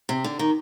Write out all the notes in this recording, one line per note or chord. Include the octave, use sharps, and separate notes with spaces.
C3
D3
D#3